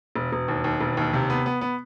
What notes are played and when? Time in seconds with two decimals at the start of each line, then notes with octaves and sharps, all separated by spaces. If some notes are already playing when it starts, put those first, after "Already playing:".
0.16 E1
0.32 E1
0.48 D#2
0.64 D#2
0.80 E1
0.97 D#2
1.13 C3
1.30 B3
1.46 B3
1.61 B3